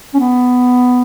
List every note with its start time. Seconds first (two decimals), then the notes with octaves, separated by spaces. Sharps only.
0.14 C#4
0.19 B3